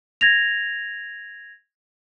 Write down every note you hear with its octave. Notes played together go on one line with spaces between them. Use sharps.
G#6 A#6 F7